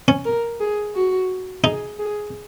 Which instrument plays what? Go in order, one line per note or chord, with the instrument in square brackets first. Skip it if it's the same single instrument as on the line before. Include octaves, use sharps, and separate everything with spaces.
[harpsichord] C#4
[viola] A#4
G#4
F#4
[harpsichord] D#4 [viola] G#4
[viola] G#4